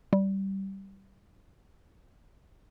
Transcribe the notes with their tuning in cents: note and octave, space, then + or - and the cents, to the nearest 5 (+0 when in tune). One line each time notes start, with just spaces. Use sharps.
G3 -15